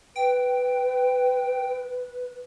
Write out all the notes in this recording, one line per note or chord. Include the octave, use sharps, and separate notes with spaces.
B4 G5